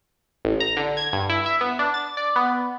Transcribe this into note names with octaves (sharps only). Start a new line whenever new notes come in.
A1
A#5
D3
G#6
G2
E4
E5
B3
D4
A6
D5
B3